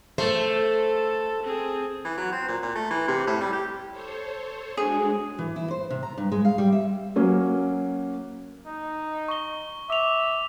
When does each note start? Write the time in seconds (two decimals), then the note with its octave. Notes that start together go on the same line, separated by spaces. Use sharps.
0.18 A3 A4 C5
1.43 C4 G#4
2.05 E3
2.18 F#3
2.33 C4
2.48 A#2
2.63 A#2
2.76 A3
2.91 E3
3.08 C3
3.27 A2
3.41 G3
3.53 G4
3.92 A4 C5 C#5
4.77 G#3 D4 F#4 G#4
5.39 E3
5.56 E4
5.71 C5
5.90 C3
6.03 A#5
6.18 G2
6.32 G#3
6.45 F5
6.58 G3
6.72 E5
7.16 F#3 A#3 C#4
8.66 D#4
9.28 C#6 G7
9.90 E5 D6 F7